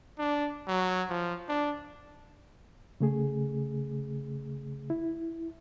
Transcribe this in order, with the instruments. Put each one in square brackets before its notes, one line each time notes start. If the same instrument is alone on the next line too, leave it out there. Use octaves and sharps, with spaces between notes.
[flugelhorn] D4
F#3
F3
D4
[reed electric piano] C#3 A3 G#4
E4